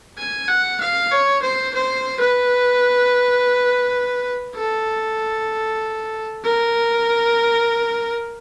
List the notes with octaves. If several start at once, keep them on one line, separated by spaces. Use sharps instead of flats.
G#5
F#5
F5
C#5
C5
C5
B4
A4
A#4